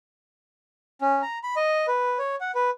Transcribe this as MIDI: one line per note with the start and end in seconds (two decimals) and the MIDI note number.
1.01 1.22 61
1.22 1.39 82
1.43 1.55 83
1.56 1.86 75
1.88 2.18 71
2.19 2.35 73
2.41 2.51 78
2.55 2.70 71